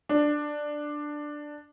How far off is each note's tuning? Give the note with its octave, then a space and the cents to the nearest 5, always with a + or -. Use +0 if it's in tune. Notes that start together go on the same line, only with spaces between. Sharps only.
D4 +10